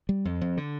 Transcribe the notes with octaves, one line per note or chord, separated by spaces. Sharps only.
G3
F2
F2
D3